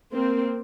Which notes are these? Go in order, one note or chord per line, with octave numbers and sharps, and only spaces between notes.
A#3 C4